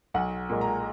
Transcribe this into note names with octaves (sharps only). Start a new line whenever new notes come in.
B1 F#5
A#2 G#3
A#5